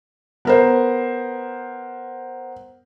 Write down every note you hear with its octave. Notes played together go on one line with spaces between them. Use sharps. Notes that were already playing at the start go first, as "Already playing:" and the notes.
B3 A#4 C5